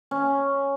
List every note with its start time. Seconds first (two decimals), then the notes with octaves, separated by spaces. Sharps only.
0.11 C#4